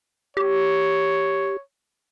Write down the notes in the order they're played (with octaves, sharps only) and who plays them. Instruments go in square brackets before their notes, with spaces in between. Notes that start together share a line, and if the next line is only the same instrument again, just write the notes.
[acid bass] G4 [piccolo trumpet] C#5